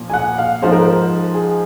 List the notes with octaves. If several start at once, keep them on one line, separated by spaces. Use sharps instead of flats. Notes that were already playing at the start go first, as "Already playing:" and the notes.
Already playing: A#2 F3
G#5
F#5
F5
G#2 F3 G#3 C5
A#4
C5
G#4